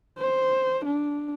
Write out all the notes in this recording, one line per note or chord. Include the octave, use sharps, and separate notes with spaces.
C5
D4